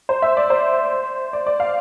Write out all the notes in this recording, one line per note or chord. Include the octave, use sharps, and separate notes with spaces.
C5
E5
D5
C5
D5
D5
F5